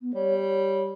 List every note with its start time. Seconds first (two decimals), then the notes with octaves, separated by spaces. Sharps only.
0.01 B3
0.14 G3 C#5
0.39 C#5